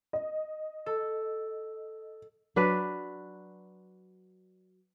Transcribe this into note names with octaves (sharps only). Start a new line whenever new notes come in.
D#5
A4
F#3 D4 F#4 B4